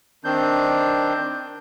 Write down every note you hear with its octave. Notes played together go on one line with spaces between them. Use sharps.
D#3 C4 D4 G6